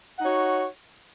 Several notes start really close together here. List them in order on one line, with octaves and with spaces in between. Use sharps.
F#5 D#4 C#5 F#4